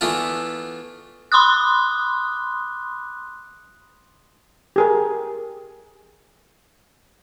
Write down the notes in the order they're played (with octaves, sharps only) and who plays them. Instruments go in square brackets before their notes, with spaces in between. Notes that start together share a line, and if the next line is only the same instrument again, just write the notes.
[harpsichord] E3 A3 B3 D4 F4
[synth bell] B5 C6 D6 D#6 F#6
[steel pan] G4 G#4 A#4